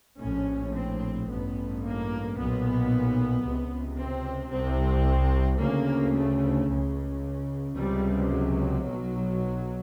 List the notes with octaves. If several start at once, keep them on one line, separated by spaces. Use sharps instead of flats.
A#1 A2 C#4
C4
A1 G2 B3
A#3
B1 A#2 B3
C#2 C3
C4
C2 C3 C4
D2 C#3 A#3
A3
C#2 C#3
C#2 C3 G3
F#3
B1 B2